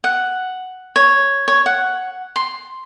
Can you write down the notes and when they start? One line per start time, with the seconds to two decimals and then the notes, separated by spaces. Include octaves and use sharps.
0.04 F#5
0.96 C#5
1.48 C#5
1.66 F#5
2.36 C6